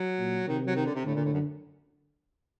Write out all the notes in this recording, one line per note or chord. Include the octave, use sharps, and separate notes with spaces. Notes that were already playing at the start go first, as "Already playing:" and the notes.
Already playing: F#3
A#2
C3 D#3
F#3
D#3
D3
C3
A2 D3
A#2
A2
F#2